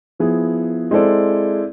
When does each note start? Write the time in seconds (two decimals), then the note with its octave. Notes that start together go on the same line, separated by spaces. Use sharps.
0.19 F3 B3 E4 G#4
0.91 G#3 C4 E4 A4 D5